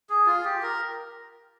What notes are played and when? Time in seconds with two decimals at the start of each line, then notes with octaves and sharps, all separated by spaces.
0.09 G#4
0.26 F4
0.45 G4
0.62 A#4